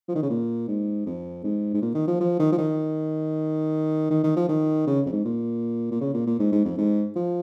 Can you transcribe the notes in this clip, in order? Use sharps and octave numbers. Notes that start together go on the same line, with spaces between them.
F3
D#3
C#3
A#2
G#2
F2
G#2
G#2
A#2
D#3
F3
F3
D#3
F3
D#3
D#3
D#3
F3
D#3
C#3
F2
G#2
A#2
A#2
C#3
A#2
A#2
G#2
G#2
F2
G#2
F3